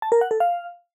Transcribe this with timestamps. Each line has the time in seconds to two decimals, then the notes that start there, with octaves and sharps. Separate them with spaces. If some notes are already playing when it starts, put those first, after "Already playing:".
0.02 A5
0.12 A#4
0.21 F#5
0.31 A4
0.40 F5